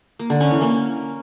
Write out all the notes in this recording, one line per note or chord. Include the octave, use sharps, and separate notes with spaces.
A#3
D3
C#4
E3
A#3